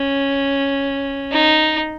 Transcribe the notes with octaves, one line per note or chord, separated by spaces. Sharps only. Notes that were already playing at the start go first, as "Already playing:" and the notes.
Already playing: C#4
D#4